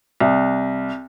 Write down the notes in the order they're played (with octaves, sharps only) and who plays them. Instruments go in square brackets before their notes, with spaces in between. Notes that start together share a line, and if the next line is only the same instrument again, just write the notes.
[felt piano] C2